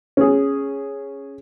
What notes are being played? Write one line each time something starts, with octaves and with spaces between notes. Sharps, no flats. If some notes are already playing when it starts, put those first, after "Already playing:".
C#4 G#4